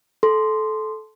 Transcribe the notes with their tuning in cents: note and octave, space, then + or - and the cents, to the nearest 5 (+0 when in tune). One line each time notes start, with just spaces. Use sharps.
A4 -20 C6 -5